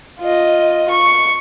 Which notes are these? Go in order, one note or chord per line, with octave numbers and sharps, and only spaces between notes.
F4 D#5
C#6